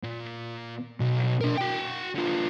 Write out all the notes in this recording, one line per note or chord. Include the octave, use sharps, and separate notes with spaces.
A#2
B1
D4 A#4
F#4 G5
D3 F4